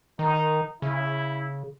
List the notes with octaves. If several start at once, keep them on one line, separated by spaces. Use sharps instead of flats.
D#3 D#4
C#3 E4